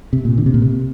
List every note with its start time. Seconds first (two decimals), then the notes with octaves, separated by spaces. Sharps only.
0.13 C3
0.25 A#2
0.38 D3
0.46 C3
0.54 A#2
0.62 C3